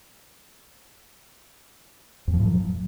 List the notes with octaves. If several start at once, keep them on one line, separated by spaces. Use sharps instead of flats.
F2
F3
A2
F#3